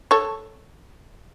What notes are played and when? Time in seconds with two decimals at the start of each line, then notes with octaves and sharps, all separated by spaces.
0.11 A4 C#5